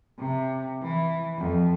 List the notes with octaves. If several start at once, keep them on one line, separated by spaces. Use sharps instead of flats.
C3
E3
F2